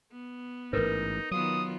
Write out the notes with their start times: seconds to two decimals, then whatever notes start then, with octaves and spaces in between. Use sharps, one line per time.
0.12 B3
0.73 A1 G#2 D#4 A#4 B4
1.31 D#3 F#3 B3 F4 D#6